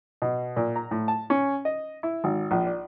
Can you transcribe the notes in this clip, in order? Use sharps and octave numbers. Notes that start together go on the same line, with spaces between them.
B2
A#2
A#5
A2
A5
C#4
D#5
E4
G#1
A#1
D5